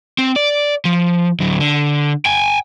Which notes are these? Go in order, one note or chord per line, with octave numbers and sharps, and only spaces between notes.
C4
D5
F3
D2 F#3
D3
G5 G#5